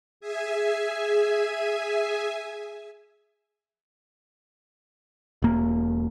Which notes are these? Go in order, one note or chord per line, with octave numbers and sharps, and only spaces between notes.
G#4 E5 G#5
E1 A#3